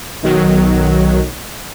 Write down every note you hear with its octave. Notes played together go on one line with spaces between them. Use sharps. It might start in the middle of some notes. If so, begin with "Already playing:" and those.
B1 D#3 F#3